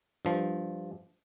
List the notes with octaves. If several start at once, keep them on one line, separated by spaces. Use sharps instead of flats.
G2 F3